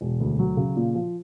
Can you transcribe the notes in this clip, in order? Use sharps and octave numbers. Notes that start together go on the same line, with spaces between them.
E1
D2
F#3
C#3
A#2
F3